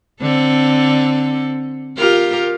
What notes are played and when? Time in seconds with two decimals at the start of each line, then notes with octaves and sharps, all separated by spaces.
0.21 D3 C4 A4
1.97 F4 G4 A#4